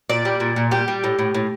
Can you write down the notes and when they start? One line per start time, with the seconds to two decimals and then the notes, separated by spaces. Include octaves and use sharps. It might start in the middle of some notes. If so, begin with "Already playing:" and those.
0.10 A#2 D5
0.25 G3
0.40 A#2
0.56 A#2
0.71 G3 G4
0.88 G3
1.04 A2
1.19 A2
1.34 A2